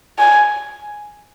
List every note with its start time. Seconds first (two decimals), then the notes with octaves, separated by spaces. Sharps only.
0.19 G#5